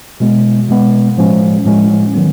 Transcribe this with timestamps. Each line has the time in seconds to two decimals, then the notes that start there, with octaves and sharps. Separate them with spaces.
0.20 B2 G#3 B3
0.69 B2 G#3 B3
1.17 A2 F3 G#3 C#4
1.66 A2 F3 G#3 C#4
2.14 D#3 F#3 B3